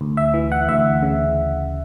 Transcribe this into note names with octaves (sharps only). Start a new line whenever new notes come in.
D2
E5
E3
F#5
D2 E5
C#3